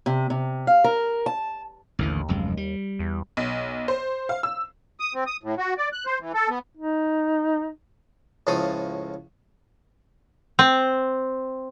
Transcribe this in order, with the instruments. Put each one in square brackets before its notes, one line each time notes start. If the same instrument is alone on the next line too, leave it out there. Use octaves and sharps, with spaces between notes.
[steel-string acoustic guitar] C3
C3
F5
A#4
A5
[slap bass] A1 D3 E3 [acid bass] D#2
[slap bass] F1 F#2 G#3
G3
[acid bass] E2
[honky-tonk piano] B1
C5
F5
E6
[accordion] D#6
C4
D#6
A2
F#4
D5
F#6
C5
E3
A4
B3
[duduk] D#4
[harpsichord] C#2 A2 F3 A3 A4 D#6
[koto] C4